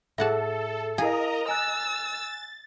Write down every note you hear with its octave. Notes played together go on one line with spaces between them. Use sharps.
A2 G#4 A4 E5 F#5 A5
E4 G#4 A#4 D#5 F5 A#5
G#5 E6 F#6 A6